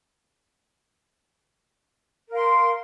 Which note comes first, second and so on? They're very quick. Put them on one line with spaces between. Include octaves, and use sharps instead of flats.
A#4 F5 C6